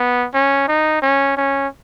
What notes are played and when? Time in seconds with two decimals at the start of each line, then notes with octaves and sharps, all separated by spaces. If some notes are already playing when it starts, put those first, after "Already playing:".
Already playing: B3
0.34 C#4
0.68 D#4
1.02 C#4
1.37 C#4